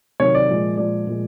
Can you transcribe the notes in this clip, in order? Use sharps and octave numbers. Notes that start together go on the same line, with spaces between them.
C3 D#3 F#3 C#5
D5
A#2 F3 G#3
A#2 F3 G#3 D5
A#2 F3 G#3